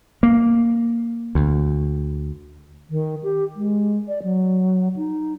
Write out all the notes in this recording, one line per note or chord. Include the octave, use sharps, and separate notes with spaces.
A#3
D2
D#3
G4
G#3
D5
F#3
D#4